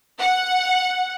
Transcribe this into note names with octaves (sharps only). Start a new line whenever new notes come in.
F#5